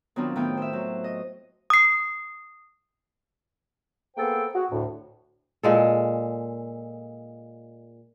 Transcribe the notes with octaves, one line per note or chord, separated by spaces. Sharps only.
D#3 F#3 B3 C4 D4 F4
A2 D#3 A3 B3 G5
C5 E5
F#3
D#5
D#6 C7
A#3 B3 G#4 A4 C5 G5
F#4 G#4
D2 A2
A#2 G#3 A4